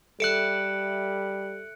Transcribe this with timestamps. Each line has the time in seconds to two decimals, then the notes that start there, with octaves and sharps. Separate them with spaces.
0.20 G3 A4 E5 F#6 C#7 D7 F#7